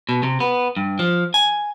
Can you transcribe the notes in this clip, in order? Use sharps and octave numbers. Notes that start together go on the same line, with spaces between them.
B2
C3
B3
G2
F3
G#5